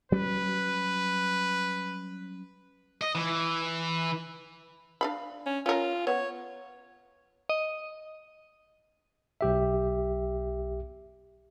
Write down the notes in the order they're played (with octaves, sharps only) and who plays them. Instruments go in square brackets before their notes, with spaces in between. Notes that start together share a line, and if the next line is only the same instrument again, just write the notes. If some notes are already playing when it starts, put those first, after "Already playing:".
[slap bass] F#3 G3 C#4 [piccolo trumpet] B4
[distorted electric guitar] D#5
E3
[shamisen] D4 F5 B5
[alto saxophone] C#4
[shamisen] C#4 A#4 [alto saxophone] F4
[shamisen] B3 [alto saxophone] C#5
[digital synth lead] D#5
[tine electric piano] B1 G4 E5